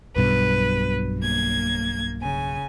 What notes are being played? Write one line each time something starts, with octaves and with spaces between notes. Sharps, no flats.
B1 G2 B2 B4
A#3 G#6
C#3 G#5